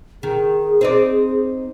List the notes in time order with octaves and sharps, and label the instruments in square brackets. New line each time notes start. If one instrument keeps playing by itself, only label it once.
[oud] D#3 [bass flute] G#4
[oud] C4 D#4 D5